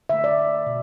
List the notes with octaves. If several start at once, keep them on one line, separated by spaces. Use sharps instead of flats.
D3 A3 E5
D5
B2